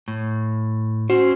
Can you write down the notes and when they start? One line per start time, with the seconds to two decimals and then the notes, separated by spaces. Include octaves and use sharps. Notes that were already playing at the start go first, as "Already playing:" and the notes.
0.08 A2
1.10 C#4 F#4 C5